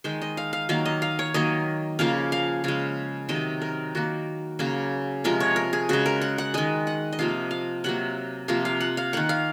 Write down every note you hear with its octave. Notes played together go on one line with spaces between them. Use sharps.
D#3 G#3 C5
D#5
F5
F5
D#3 F#3 A#3 F5
D#5
F5
C#5
D#3 F#3 A#3 D#5
C#3 F3 A#3 F5
F5
C#3 G#3 F5
C3 D#3 F#3 D#5
A#4
D#3 A#3 F#4
C#3 F#3 A#3
C3 F3 G#3 A#4
C#5
A#4
G#4
C#3 G#3 F#4
A#4
F#5
F#5
D#3 G#3 D#5
F#5
D#5
C3 F3 A#3 F5
F5
C3 F#3 A#3 F#5
C3 F3 A#3 F5
F5
F#5
F5
D#3 A#3 F#5
F5